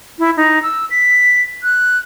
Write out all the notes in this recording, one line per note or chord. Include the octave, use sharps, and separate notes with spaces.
E4
D#4
E6
B6
F#6